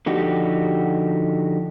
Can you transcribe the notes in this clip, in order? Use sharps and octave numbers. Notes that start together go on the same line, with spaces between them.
D3 F3 D#4 F#4 G4